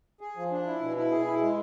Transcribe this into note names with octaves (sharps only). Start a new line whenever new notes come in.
G#4
F3
D4
E4
B2
E4
G#4
E4
G#3